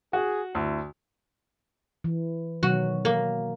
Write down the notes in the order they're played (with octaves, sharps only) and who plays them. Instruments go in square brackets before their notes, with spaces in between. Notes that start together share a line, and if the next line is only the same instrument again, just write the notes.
[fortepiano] F#4 [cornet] G#4
[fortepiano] D2 [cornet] E4
[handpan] E3
[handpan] B2 D#3 F#3 [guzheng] F#4
[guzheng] A#3